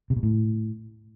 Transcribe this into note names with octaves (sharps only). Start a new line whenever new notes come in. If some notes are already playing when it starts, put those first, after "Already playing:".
C3
B2
A2